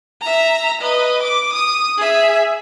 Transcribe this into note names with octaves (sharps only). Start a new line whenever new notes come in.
E5 A#5
B4 D#5
D6
D#6
G#4 E5